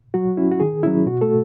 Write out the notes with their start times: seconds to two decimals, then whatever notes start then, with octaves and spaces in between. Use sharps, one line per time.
0.14 F#3 F#4
0.37 C#4 E4
0.51 F#4
0.60 D#3 G#4
0.83 F#3 C#4 E4
1.06 B2 F#4
1.21 A3 A4